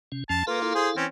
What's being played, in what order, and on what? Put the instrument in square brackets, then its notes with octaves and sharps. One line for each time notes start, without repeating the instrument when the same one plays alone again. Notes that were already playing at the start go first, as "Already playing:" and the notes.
[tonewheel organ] C3 C#4
[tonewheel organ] F2 F3 C#4 [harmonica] A5
[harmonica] A#3 F4 [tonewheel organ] A4 B4 A#5
[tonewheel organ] E4 A4 F5
[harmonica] G#4 C5
E3 C4 C#4